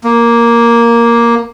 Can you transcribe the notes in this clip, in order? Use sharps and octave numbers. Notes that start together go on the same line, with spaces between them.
A#3